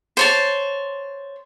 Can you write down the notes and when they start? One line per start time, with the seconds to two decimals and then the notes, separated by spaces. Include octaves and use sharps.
0.17 C5 C#5 A5